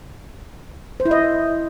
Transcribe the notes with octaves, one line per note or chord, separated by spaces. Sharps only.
C5
E4
D#5